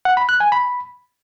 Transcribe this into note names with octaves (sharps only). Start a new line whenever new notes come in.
F#5
B5
F#6
G#5
B5